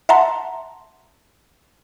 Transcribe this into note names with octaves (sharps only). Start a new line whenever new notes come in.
E5 F#5 A5 A#5 C6